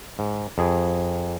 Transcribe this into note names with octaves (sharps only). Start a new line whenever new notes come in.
G#2
F2 G#4